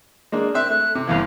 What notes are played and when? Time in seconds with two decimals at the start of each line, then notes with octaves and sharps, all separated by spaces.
0.32 G#3 A#3 D4
0.54 C4 E5 F#6
0.70 A3 F#6
0.95 C3
1.07 G1 G2 E3 F5